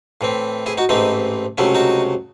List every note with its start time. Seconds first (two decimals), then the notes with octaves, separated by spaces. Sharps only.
0.21 A2 E3 C4
0.66 E4 G#4
0.78 D#4 F#4
0.89 A1 G#2 E3 A3 C4 D#4
1.58 C#2 C3 F#3 A3 C#4 E4
1.75 D#4 F#4